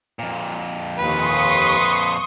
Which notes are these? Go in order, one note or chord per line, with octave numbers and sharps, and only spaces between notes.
F2 A#2
D#2 B4 C6 C#6 D#6